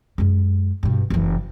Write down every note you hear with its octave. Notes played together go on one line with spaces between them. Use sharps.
F#2 G#3
G2 B2
F#1 E3